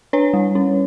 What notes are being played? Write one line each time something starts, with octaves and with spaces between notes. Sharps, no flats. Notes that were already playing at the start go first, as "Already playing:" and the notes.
D4 B4 C#5
G3
C#4